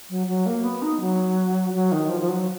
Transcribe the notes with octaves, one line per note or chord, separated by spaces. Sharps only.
F#3
F#3
A#3
B3
D#4
F#3
F#3
D#3
F3
F3
F#3